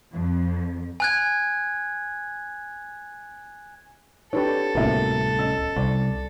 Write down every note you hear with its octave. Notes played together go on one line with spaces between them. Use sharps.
F2
G#5 F#6 G#6
D4 G4 A4 B4 C#5
D1 C2 A2 A#3 B3 C#4 F#4 E5
C#4 D#5 E6
C2 D5